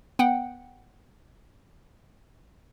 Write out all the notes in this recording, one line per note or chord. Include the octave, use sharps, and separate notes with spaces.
B3 F#5 G5